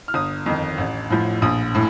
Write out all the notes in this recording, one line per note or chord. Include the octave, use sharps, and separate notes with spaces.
F6
G1 D#6
F2 D#3
A1
A2 F3
A#1 D#6
A2